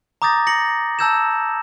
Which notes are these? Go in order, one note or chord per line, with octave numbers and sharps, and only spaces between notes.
A#5 D6 D#6 G6 A6 A#6
A#6 C#7 F#7
A5 A#5 E6 G6 G#6 E7